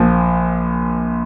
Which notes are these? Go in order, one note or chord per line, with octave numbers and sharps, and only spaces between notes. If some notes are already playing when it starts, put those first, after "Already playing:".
Already playing: A#1 A#2 F3